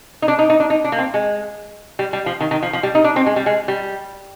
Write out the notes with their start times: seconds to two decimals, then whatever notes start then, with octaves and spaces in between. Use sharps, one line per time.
0.22 D#4
0.28 D4
0.39 D#4
0.50 D#4
0.60 D4
0.70 D#4
0.85 D4
0.92 A#3
0.99 C4
1.14 G#3
1.99 G3
2.13 G3
2.26 F3
2.41 D#3
2.51 D#3
2.63 F3
2.73 F3
2.83 G3
2.95 D#4
3.04 D4
3.16 C4
3.26 G#3
3.36 G3
3.46 G#3
3.68 G3